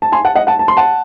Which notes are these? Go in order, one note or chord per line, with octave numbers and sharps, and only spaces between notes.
A5
G#5 C6
F#5 A5
D#5 F#5
F#5 A5
A5
C6
F#5 A5